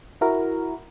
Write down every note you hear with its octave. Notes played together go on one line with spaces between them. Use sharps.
E4 F#4 A#4